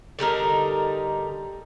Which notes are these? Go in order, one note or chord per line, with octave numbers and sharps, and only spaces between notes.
D3 G3 D#4 A#4